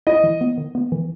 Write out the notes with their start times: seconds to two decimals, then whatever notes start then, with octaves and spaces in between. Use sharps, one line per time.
0.07 E4 D#5
0.24 E3
0.41 B3
0.58 D#3
0.75 B3
0.92 E3